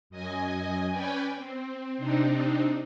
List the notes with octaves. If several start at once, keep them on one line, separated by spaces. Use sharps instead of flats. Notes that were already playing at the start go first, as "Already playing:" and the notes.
F#2 D#5 G#5
C#4 B4 D5 G5 G#5
C4
C3 C4 D4 D#4